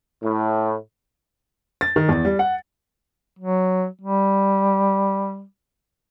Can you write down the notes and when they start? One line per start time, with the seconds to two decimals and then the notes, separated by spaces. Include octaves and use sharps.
0.23 A2
1.81 A6
1.96 D#3
2.09 E2
2.25 G3
2.39 F#5
3.39 F#3
4.01 G3